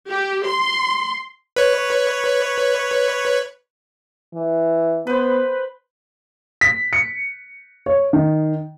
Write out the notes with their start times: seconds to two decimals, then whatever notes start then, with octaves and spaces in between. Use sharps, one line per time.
0.11 G4
0.46 C6
1.56 B4 C#5
4.34 E3
5.07 B3 B4 C5
6.61 B6
6.93 C#7
7.86 C#5
8.13 D#3